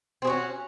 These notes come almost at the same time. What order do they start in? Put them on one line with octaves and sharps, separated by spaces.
C4 G#4 F#4 C#4